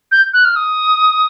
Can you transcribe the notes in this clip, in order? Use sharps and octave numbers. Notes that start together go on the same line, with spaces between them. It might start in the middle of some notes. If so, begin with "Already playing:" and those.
G6
F#6
F6
D#6